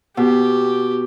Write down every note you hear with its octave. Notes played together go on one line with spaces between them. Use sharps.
B2 G4